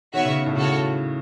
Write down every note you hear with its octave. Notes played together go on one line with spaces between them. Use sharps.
D#3 B3 F#4 C#5 E5
C#3
A2
C#3 F#4 A4 C#5